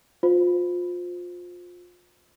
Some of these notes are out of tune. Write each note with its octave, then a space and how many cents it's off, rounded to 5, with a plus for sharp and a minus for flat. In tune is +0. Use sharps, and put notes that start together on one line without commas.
F4 +25 C5 -20